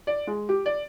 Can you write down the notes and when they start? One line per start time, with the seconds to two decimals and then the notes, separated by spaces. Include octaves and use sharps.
0.07 D5
0.27 G#3
0.49 G4
0.66 D5